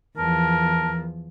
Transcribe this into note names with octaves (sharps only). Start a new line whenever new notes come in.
E2 F3 A#4 A5